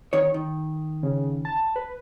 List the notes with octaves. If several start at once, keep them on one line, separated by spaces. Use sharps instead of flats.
D#3 C#5
D#3
C#3
A5
B4